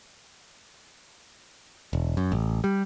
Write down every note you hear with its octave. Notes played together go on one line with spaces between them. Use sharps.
E1
F#2
A1
G3